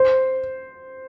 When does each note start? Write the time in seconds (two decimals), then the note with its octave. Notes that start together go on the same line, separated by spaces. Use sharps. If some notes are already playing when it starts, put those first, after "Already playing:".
Already playing: C5